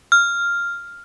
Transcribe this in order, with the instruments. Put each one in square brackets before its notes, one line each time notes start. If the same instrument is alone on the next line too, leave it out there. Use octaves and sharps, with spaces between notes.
[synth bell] F6